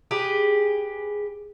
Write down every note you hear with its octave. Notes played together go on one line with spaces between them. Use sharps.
G4 G#4 B4